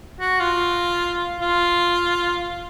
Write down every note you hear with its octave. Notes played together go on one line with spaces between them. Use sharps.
F#4
F4
F4